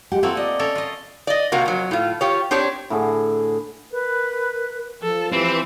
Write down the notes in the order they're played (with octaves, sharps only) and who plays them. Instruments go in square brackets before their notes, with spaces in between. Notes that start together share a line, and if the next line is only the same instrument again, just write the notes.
[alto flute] G#3 [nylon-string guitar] G4 F#5
[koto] A3 A#3 C4 [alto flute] F4 [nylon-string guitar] F#5
[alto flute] D5 [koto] D#5
[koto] C#4 A4 A#4
F4 D#5
[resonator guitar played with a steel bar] D5 D#5
C3 A#3 F#4
F2 F#3
A2 F4
F4 G4 C#5
C4 D4 G4 C#5
[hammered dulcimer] A2 D3 G#4
[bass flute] A#4 [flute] B4
[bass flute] F3 [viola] A4
[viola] E3 [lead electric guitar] C4 [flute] G4